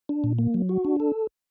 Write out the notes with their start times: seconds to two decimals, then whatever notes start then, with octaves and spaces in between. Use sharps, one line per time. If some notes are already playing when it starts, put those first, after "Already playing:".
0.09 D4
0.24 A#2
0.39 A#3
0.54 F#3
0.69 F#4
0.85 D4
1.00 A4